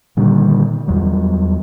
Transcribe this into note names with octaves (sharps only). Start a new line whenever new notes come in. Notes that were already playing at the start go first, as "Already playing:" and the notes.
A#2 D3 D#3 G3
E2 F#3 G3